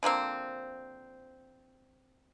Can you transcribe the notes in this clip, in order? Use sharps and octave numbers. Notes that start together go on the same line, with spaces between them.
D3 F3 A#3 C4